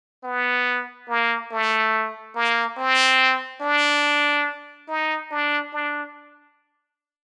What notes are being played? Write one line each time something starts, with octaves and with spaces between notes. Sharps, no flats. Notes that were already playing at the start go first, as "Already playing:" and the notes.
B3
A#3
A3
A#3
C4
D4
D#4
D4
D4